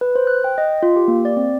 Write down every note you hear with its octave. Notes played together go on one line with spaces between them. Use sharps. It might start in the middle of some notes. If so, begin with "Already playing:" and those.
B4
C5
F#6
G5
D#5
F4
G4
A#3
D5
C4